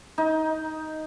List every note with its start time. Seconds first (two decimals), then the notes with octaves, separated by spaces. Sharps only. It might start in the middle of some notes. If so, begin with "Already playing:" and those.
0.18 D#4